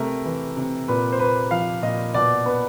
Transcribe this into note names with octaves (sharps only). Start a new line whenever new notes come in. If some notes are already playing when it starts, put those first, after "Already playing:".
Already playing: C3 A3 A#4
E3
C3
A#2 B4
C5
A#3 B4
F3 F5
A#2 D#5
B2 D5
B3